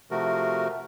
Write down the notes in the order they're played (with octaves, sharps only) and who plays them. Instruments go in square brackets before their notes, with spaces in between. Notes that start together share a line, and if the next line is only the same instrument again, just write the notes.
[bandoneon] C3 F3 A3 F#4 A#4